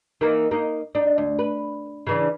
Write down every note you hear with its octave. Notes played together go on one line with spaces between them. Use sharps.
D#3 E3 A#3
A#3 D#4
D4 D#4
D2
B4
C#3 E3 D4